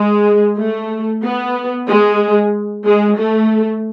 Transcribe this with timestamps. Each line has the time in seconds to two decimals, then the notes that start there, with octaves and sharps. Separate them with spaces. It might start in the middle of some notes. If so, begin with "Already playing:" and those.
Already playing: G#3
0.57 A3
1.23 B3
1.87 G#3
2.85 G#3
3.18 A3